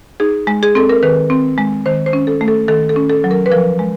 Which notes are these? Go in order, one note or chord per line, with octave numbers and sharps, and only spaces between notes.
D#4 G#4
G#3
G#4
C4 A4
A#4
D#3 B4
C4
G#3
D#3 C5
C5
C#4
A4
A3
A4
D#3 A4
A4
C#4
A4
F#3
A#4
B4
F3 A#4
G#3